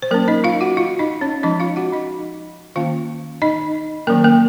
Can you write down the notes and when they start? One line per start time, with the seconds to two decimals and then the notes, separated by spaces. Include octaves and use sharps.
0.02 C5
0.11 F#3 A#3 C#4 A#4
0.28 D#4 D#5
0.44 F4 F5
0.61 F#4 F#5
0.77 F4 F5
0.99 D#4 D#5
1.21 C#4 C#5
1.43 F3 G#3 C#4 D#4 D#5
1.60 F4 F5
1.76 F#4 F#5
1.92 D#4 D#5
2.76 D#3 A#3 C#4 F4 F5
3.42 D#4 D#5
4.07 D#3 F#3 A#3 C#4 A#4
4.24 A#3 A#4